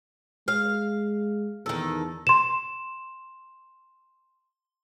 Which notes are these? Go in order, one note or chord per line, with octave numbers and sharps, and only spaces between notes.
G#3 F5
E2 D#3 A4
C6 E7